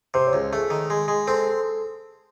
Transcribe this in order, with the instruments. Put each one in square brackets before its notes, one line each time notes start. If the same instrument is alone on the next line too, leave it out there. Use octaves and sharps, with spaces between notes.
[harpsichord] C3 [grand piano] C5
[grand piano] C#5
[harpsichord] C#2
[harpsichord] A3 [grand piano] G#4
[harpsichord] D#3
G#3
G#3
[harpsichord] C4 [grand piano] A4